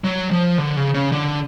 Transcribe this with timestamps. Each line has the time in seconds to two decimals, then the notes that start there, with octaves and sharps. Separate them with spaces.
0.04 F#3
0.31 F3
0.58 D3
0.76 C#3
0.94 C#3
1.12 D3